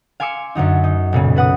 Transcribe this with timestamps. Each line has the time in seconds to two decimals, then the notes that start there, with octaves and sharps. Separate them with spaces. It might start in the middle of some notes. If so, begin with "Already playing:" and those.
0.20 F5 G#5 C6 D6 E6 C#7
0.55 F#2 D3 F#3 D#4
0.84 D#4
1.13 B1 A#2 C#3
1.35 A4 B4 F#5 D#6